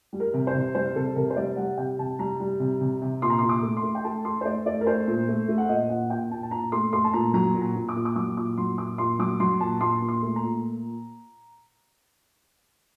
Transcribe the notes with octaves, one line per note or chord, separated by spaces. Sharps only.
G3
A#4
C3
C5
C3
G3 C5
C3 A4
C3 A#4
C5
G3 D5
G3 F#5
C3 G5
C3 A5
G3 A#5
G3
C3
C3
C3
A#2 C6
A#5
A#2 C6
D6
A3
C6
A3
G5
A3 A5
A3 C6
C5
A3 D5
A3 D5
A#4
A3 C5
A#2
A3
A3
F#5
A#2 D#5
A#2 F#5
A#2 G5
A#2 A5
A5
A#2 A#5
A3 C6
A3 C6
A5
A#2 A#5
F#3 A#5
A#2
A#5
A#2
D6
A#2
D6
F#3 D6
A#2 D6
F#3 C6
A#2 D6
A#2 C6
F#3 D6
F#3 C6
A#2 A5
A#2 C6
A#2
C6
A3
A#5
A#2